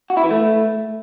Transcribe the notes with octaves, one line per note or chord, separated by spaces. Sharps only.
F#4
E4
E3
A3